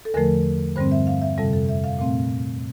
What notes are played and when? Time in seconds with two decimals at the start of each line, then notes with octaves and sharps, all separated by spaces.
0.05 A4
0.14 E2 D3 F3 A3 A#4
0.76 G2 D3 G3 C4 C5
0.91 E5
1.07 F5
1.22 E5
1.38 F2 C3 G3 A4
1.53 A4
1.69 E5
1.84 F5
1.99 A#2 A3 C4 F5